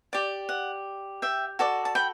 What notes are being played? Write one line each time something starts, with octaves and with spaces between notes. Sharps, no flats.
G4 D5
F#5
E5 G5
F#4 A4 D5
A5
G5 B5